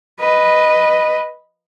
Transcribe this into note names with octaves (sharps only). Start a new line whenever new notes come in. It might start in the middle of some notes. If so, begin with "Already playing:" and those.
B4 D#5